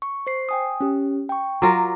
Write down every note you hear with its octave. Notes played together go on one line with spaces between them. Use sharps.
C#6
C5 C7
G5 G#5 D#6
C#4 G4
G5 C#6
F#3 F4 A#4 D6 A#6